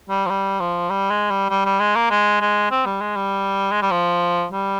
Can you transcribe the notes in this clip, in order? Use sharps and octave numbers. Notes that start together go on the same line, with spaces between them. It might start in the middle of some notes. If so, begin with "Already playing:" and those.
G3
F3
G3
F3
G3
G#3
G3
G3
G3
G#3
A#3
G#3
G#3
C4
G3
G#3
G3
G#3
G3
F3
G3